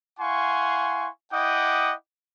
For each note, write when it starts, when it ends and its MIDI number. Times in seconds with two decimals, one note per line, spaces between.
0.19 1.09 64
0.19 1.09 77
0.19 1.09 78
0.19 1.09 80
0.19 1.09 84
0.19 1.09 85
1.32 1.93 64
1.32 1.93 75
1.32 1.93 78
1.32 1.93 79
1.32 1.93 86
1.32 1.93 87